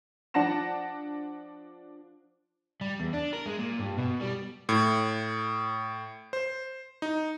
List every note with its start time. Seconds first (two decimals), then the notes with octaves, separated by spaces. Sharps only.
0.34 F3 D4 F#5 A5 A#6 E7
2.81 G3
3.00 E2
3.13 D4
3.33 A#4
3.46 G#3
3.60 A#2
3.80 G2
3.98 B2
4.21 G3
4.69 A2
6.33 C5
7.02 D#4